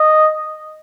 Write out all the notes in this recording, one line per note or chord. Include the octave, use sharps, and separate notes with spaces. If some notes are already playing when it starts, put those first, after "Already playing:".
Already playing: D#5